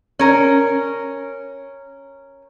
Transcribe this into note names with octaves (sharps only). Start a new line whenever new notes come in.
C#4 A#4